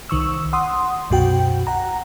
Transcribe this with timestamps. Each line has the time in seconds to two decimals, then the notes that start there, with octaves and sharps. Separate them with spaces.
0.09 C2 D#3 C#6 E6
0.53 F#5 C6 D#6
1.10 C2 F#2 B2 F#4 G5
1.67 F#5 A#5